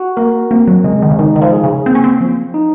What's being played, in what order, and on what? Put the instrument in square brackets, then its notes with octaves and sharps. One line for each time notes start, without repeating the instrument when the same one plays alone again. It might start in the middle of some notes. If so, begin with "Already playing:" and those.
Already playing: [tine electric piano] F#4
[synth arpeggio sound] A#3 [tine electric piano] A#4
[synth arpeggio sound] A#3 [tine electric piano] C4
[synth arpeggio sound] F#3
[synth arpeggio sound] C#3 [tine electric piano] G#3
[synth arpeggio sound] D#3
C#3
[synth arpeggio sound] D#3 [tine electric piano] D#4
[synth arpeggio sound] D#3
F3
[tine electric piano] G#4
[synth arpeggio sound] C#3
[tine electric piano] A#3 [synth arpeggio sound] C4
[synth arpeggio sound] C#4
C4
[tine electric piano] F3
D#4